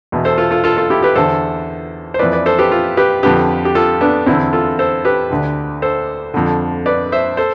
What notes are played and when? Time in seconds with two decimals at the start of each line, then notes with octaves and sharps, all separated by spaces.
0.12 E2 B2
0.25 A4 C5
0.38 F4 A4
0.51 F4 A4
0.64 F4 A4
0.77 F4 A4
0.90 E4 G4
1.02 G4 B4
1.15 E2 D3 A4 C5
2.14 C5
2.19 F2 E3 B4 D5
2.33 B4 D5
2.46 A4 C5
2.58 G4 B4
2.72 F4 A4
2.97 G4 B4
3.23 F2 D3 G4 B4
3.65 G4
3.75 F4 A4
4.01 B3 D4
4.26 E2 D3 C4 E4
4.53 F4 A4
4.79 A4 C5
5.05 G4 B4
5.31 D2 D3
5.82 A4 C5
6.34 F2 D3
6.86 B4 D5
7.12 C5 E5
7.37 A4 C5